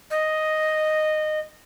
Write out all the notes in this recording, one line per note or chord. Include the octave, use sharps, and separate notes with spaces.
D#5